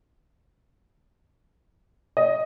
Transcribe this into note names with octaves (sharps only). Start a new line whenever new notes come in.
D#5